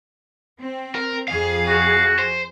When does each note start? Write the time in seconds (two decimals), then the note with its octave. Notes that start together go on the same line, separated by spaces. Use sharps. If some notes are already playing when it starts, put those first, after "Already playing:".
0.59 C4
0.95 A#4
1.28 F2 G#4 F5
1.68 F#4
2.19 C5